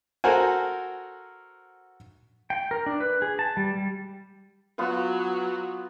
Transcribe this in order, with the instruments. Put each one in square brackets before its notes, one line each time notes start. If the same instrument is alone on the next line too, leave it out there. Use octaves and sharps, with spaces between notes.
[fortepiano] F#4 A4 A#4 C5 F#5 G#5
[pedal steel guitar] G5
A#4
D4
B4
G#4
A5
G3
G3
[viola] F#3 [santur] B3 F4 B4